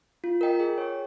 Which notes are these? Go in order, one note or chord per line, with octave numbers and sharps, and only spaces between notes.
F4
A#4 D#5 G5
G#4
C#5 G5